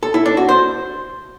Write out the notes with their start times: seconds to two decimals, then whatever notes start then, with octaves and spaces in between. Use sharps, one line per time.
0.03 A4
0.14 E4
0.26 D4
0.37 F#4
0.49 C5